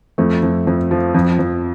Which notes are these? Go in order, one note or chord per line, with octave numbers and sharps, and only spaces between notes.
F2 A3
F2
F2
F3
F2
F2